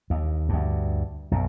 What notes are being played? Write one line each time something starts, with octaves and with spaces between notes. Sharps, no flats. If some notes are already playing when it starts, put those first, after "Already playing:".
D#2
D2 G2
B1 F#2